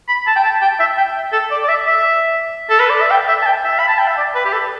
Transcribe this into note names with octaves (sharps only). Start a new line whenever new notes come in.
B5
A5
G5
A5
G5
E5
G5
A4
D5
D5
E5
E5
A4
B4
D5
E5
G5
E5
A5
G5
E5
B5
A5
G5
E5
D5
B4
G4
A4